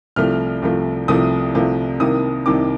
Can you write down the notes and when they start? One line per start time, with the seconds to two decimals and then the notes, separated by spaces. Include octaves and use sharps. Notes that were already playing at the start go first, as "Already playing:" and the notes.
0.16 C2 C3 F3 A3 F6
0.62 C2 C3 F3 A3
1.08 C2 C3 F3 A3 D#6
1.54 C2 C3 F3 A3
2.00 C2 C3 D#3 A#3 D#6
2.46 C2 C3 D#3 A#3 D6